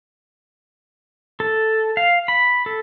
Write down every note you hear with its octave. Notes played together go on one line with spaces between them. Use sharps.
A4
F5
B5
A4